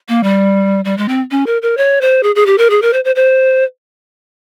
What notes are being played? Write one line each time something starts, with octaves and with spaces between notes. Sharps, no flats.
A#3
G3
G3
G#3
C4
C#4
A#4
A#4
C#5
C5
G#4
G#4
G4
A#4
G#4
A#4
C5
C5
C5